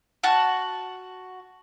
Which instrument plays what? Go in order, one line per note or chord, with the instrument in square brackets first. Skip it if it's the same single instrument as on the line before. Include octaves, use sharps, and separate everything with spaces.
[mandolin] F#4 F#5 A5